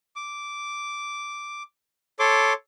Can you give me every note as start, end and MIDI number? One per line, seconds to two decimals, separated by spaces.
0.16 1.63 86
2.19 2.53 69
2.19 2.53 73
2.19 2.53 84
2.19 2.53 86